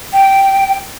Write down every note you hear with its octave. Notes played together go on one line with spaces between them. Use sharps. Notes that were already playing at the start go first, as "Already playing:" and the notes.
G5